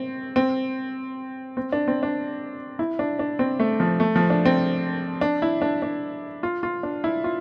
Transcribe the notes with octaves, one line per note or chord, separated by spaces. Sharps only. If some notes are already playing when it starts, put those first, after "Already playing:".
Already playing: C4
C4
C4
D4
C4
D4
E4
D4
D4
C4
A3
F3
A3
F3
D4
C4
D4
E4
D4
D4
F4
F4
D4
E4
F4